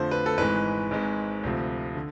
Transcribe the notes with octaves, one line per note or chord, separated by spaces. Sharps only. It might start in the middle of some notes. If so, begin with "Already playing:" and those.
Already playing: F2 D3 F3 A3 C5
B4
A4
G#1 G#2 E3 G#3 B4
G#1 G#2 G#3
D2 C3 F3
D3